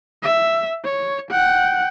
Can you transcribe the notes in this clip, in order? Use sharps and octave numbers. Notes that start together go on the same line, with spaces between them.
E5
C#5
F#5 G5